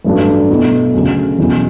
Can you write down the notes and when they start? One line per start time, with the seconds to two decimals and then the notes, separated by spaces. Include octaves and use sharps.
0.04 A1 G2 F#3 A3 D4
0.49 B2 A3 E4
0.94 D2 C#3 F#3 C#4
1.38 E2 B2 F#3 C#4 E4